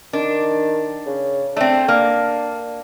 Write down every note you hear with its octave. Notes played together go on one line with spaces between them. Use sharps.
D#3 D4
C#3
A3 C4 D4
A#3 D4